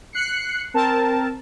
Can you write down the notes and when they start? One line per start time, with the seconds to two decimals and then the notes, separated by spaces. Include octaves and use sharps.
0.13 F#6 C7 C#7
0.74 C4 A#4 A5